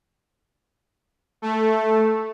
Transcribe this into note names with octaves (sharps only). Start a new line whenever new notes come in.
A3